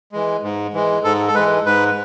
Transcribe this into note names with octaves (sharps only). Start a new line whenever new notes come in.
E3 G#3
G#2
E3 G#3
G#2 A4
A4
E3 G#3 B4
G#2 B4